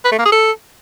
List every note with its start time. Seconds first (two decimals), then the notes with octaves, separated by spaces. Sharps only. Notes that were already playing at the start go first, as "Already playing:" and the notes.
0.05 B4
0.12 A3
0.18 A#3
0.25 G#4
0.32 A4